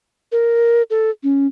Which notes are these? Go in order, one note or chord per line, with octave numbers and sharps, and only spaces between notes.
A#4
A4
C#4